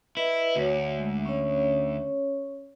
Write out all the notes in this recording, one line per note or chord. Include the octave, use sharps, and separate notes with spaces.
E4 B4 D#5
D2 F#4 C#5
G#3
C#4 C#5